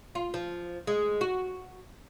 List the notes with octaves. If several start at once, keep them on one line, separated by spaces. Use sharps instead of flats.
F4
F3
G#3
F#4